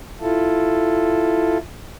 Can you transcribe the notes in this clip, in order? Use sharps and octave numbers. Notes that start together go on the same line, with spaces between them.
E4 F4 A4